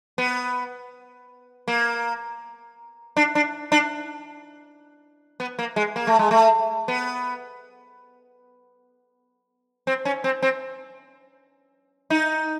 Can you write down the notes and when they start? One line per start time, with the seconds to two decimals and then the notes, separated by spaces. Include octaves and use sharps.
0.18 B3
1.68 A#3
3.17 D4
3.35 D4
3.72 D4
5.40 B3
5.59 A#3
5.76 G#3
5.96 A#3
6.07 A3
6.19 G#3
6.31 A3
6.88 B3
9.87 C4
10.05 C#4
10.24 C4
10.42 C4
12.10 D#4